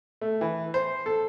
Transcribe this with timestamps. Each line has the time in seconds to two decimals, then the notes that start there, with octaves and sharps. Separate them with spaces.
0.21 A3
0.41 E3
0.74 C5
1.06 A4